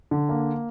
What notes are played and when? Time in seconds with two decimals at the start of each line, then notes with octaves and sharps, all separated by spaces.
0.11 D3
0.29 A#3